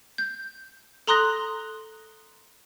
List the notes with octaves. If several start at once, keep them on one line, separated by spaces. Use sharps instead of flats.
G6
A4 A#5 C6 D#6 F#6 A#6